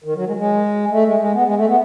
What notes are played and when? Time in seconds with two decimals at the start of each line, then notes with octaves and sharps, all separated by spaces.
0.04 D#3
0.15 F#3
0.26 G#3
0.36 G#3
0.91 A3
1.05 G#3
1.19 G#3
1.34 B3
1.45 G#3
1.56 A3
1.67 B3